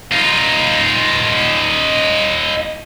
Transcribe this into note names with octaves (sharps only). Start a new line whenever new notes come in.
D#4 F4